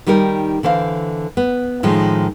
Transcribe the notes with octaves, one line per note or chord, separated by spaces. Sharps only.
D#3 G3 D#4 G4 A#4
D3 E3 C5 F5
B3
A2 D#3 F3 G#3